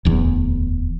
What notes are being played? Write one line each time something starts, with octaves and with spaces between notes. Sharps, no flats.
D1 E2